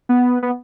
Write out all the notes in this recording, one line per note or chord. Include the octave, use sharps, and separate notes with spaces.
B3
B3